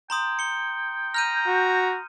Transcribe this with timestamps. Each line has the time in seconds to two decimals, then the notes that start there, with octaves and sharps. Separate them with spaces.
0.10 G5 A#5 C6 D#6
0.39 C#7 G7
1.14 A#5 F6 G6 D#7
1.47 F#4